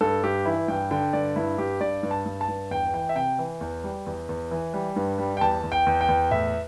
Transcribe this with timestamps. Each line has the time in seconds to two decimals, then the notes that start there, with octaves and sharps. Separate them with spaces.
0.01 G2 A4
0.23 G2 G4
0.46 E3 E4
0.68 G2 G5
0.91 D3 G5
1.13 G2 D5
1.36 G2 E4
1.58 G2 G4
1.81 G2 D5
2.03 G2
2.11 A5
2.26 G2
2.41 A5
2.48 G2
2.71 E2 G5
2.94 E3 G5
3.09 E5
3.16 C3 G5
3.39 E3
3.61 E2
3.84 G3
4.06 E2
4.29 E2
4.51 E3
4.74 G3
4.96 G2
5.18 G3
5.37 G5
5.41 E2 A5
5.63 E2
5.72 G5
5.86 E2
6.01 G5
6.09 E2
6.31 A2 E5